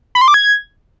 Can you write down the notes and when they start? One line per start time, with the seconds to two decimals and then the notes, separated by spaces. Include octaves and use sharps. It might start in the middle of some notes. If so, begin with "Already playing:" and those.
0.15 B5
0.21 C6
0.28 D6
0.34 G#6